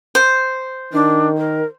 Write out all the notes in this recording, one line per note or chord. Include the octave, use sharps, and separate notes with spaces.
C5
D#3 D4
A#4